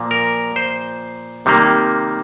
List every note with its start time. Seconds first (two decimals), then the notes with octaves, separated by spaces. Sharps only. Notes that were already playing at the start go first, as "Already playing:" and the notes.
Already playing: A#2 F3 A#3
0.11 A#4
0.56 C5
1.46 C3 D#3 G3 A#3